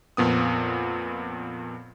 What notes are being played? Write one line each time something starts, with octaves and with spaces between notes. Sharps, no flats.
F2 A#2 B3 D#6